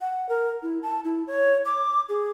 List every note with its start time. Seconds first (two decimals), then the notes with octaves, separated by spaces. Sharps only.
0.01 F#5
0.29 A#4
0.63 E4
0.83 A5
1.05 E4
1.27 C#5
1.65 D6
2.09 G#4